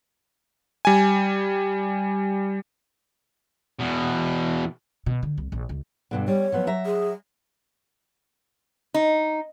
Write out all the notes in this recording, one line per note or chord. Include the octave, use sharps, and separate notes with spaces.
G3 G#5
E2 B2
B2
D3
C2
A#1
C#2
G2 B2 D3
G3 C#5
F3 F#3 B3
F#3 E5 A#5
G#4
D#4